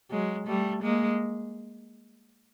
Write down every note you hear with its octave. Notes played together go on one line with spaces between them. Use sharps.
F#3 G#3
G3 A3
G#3 A#3